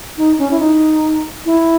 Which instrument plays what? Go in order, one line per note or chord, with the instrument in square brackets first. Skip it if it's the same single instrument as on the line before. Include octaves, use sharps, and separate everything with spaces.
[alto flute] D#4
C#4
E4
D#4
E4